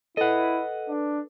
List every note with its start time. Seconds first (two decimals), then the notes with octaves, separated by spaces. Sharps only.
0.17 E4 A4 B4 D#5 F#5
0.88 D4